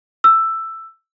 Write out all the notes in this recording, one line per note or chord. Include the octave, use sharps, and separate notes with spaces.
E6